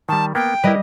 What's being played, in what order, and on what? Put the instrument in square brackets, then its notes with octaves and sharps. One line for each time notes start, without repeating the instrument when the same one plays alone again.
[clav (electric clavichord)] D#3 G3 [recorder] A5
[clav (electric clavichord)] A#3 B3 [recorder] G5
[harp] G3 D#5 [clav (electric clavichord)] E4 A#4 B4